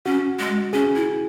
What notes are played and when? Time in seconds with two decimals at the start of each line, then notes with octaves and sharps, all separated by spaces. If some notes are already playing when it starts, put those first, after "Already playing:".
0.06 C#4 F#4
0.39 G#3
0.73 C#4 G#4
0.95 E4